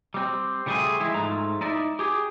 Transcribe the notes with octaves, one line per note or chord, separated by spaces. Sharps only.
G3 C4
C#3 F3 G3 A3 G#4
E3 G#3 E4
G#2 F3 A3 A#5
D#4 E4 D5
G4 G#4